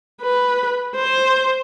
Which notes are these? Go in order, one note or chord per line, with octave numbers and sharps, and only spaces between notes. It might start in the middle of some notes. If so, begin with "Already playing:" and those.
B4
C5